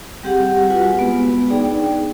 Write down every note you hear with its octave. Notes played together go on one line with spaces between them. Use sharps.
G3 C4 G4 G#4 F#5
F4 F#4 B4 F#5 G#5
G#3 B3 B4
D4 D#4 G#4 D5 G5